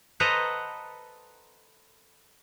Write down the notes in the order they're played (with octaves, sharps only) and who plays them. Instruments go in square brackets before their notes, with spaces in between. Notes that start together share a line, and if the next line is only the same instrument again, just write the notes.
[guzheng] A4 B4 C5 D#5 F#5 A#5